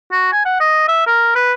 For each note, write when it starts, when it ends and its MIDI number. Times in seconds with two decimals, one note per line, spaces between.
0.12 0.29 66
0.32 0.41 80
0.45 0.59 78
0.60 0.85 75
0.88 1.06 76
1.07 1.34 70
1.35 1.53 71